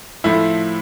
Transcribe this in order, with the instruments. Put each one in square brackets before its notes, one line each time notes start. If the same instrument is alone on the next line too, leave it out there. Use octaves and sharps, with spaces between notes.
[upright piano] A2 F3 A3 E4